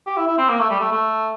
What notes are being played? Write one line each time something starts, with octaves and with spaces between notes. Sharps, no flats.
G4
E4
E4
C4
A#3
A3
G3
A3
A3